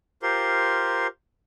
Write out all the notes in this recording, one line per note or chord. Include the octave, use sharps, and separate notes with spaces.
F4 G4 A#4 C5 C6